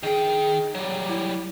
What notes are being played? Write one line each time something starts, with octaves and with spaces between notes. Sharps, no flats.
D#3 G#4 G5
F#3 G3
E4